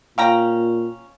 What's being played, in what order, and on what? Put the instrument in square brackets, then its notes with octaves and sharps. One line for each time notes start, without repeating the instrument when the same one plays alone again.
[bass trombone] A#2 [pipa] C#4 G5 A#5 [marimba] F5